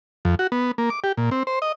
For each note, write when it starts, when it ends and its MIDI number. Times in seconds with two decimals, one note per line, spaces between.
0.25 0.35 41
0.39 0.47 66
0.52 0.71 59
0.78 0.90 58
0.90 1.00 86
1.04 1.12 67
1.17 1.30 46
1.31 1.43 60
1.47 1.59 72
1.62 1.72 75